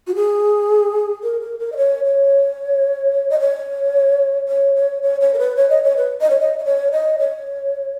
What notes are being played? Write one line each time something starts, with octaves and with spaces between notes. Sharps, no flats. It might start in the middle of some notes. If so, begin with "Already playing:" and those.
F#4
G#4
A#4
A#4
A#4
D#5
C#5
C#5
D#5
C#5
C#5
C#5
C#5
C#5
A#4
B4
C#5
D#5
C#5
B4
D#5
C#5
D#5
D#5
C#5
D#5
C#5